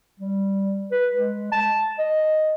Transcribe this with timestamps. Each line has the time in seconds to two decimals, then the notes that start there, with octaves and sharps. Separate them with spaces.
0.20 G3
0.91 B4
1.15 G#3
1.52 A5
1.99 D#5